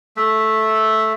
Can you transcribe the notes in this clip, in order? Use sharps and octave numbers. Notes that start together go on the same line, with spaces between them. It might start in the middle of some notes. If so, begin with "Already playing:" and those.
A3 E5